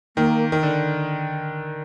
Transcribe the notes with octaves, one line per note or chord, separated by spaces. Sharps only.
D#3 A#3
D#3
D3